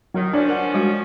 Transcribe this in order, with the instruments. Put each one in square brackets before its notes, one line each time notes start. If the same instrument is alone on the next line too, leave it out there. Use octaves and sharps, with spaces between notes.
[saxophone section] D#3 [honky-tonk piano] F#3
[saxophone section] F3 C#4 [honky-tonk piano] D4
[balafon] A#4 F#5
G3 G#3 F#4